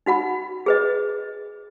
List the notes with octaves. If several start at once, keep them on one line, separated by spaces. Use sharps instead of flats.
D#4 F#4 F#5 B5
G#4 B4 D#5